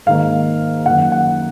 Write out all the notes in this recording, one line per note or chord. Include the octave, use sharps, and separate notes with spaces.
G#2 D#3 A#3 F5
F#2 D#3 A#3 F#5
F#5